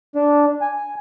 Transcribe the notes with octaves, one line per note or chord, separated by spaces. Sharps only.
D4
G#5